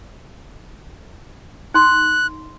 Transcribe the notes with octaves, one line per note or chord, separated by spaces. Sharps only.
D#4 C6 F#6